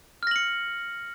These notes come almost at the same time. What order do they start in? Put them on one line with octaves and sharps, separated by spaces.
F6 A#6 F#7 C#7